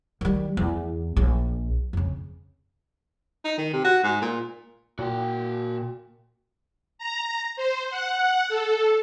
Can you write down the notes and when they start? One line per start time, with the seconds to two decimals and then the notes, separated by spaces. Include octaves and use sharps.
0.21 D#3 G3
0.57 E2
1.17 A#1
1.93 F2 C#3
3.45 D#4
3.58 D#3
3.73 C3
3.84 F#4
4.03 G#2
4.22 A#2
4.99 A#2 F#4 G5
6.99 A#5
7.56 C5
7.90 F#5
8.49 A4